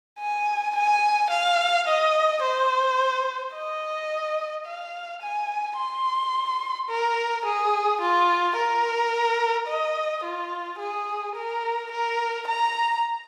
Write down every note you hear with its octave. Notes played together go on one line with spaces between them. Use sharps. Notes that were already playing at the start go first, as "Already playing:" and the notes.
G#5
G#5
F5
D#5
C5
D#5
F5
G#5
C6
A#4
G#4
F4
A#4
D#5
F4
G#4
A#4
A#4
A#5